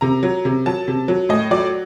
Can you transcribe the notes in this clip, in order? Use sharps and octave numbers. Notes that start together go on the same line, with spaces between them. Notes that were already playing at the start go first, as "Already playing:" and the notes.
C3 A#5
F#3
C3
F#3 A5
C3
F#3
A2 D#5
F#3 D5